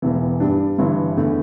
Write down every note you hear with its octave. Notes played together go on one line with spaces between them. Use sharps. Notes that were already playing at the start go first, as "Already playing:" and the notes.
E1 E2 E3
G2 G3 D4
G1 G2 E3
E2 D3 A3